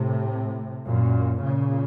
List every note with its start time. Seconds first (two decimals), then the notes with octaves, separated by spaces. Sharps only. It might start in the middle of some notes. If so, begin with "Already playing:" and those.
Already playing: A2 C3
0.85 F#2 A#2
1.45 A#2 C#3